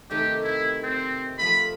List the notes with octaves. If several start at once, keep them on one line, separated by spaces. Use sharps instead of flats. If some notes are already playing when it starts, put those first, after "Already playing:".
C3 D#3 A3 G4
E4
C4
F3 A3 B5